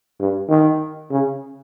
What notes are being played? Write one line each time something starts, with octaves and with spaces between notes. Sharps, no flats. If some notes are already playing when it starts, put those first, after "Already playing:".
G2
D#3
C#3